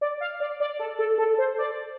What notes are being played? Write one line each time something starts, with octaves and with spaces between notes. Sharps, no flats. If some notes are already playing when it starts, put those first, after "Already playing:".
D5
F5
D5
D5
A4
A4
A4
C5
D5